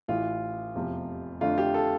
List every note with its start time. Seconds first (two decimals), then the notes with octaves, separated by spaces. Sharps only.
0.08 A1 A2 E3 F4
0.74 F1 E2 C3 F3
1.41 F2 D3 A3 D4 F4
1.58 G4
1.74 A4